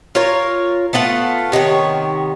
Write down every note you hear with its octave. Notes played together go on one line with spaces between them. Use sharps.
F4 A#4 C#5
A3 B3 F4 F#5
C3 D#3 B3 C#5